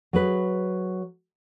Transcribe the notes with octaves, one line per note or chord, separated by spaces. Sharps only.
F#3 G#4 B4